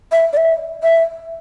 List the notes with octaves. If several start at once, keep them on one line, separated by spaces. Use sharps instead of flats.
E5
D5
E5
E5